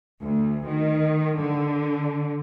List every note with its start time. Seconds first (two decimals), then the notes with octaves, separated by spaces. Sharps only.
0.21 D2
0.68 D#3
1.39 D3